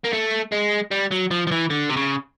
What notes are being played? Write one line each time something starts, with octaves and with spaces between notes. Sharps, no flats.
A#3
A3
G#3
G3
F#3
F3
F3
E3
D3
C3
C#3